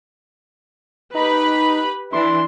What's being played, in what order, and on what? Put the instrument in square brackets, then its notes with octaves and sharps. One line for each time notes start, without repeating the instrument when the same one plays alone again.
[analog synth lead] D#4 [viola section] G4 B4 B5
[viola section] E3 D4 E4 [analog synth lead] C6